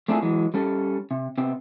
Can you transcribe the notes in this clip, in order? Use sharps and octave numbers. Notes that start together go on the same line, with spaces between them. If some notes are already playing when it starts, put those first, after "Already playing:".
A3 C4 D4 E4 F4 G#4
E3 F#3 G#3
G3 C#4 A4
C3
C3 B3 C4